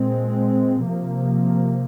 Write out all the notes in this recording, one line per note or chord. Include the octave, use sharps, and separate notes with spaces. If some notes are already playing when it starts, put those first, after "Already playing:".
Already playing: A#2 G#3 C4
C3 F3 A#3